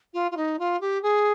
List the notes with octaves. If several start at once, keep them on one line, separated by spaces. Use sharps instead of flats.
F4
F4
D#4
F4
G4
G#4